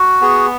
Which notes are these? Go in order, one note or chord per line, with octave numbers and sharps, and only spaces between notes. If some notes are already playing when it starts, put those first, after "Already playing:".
Already playing: F#4
B3 G#4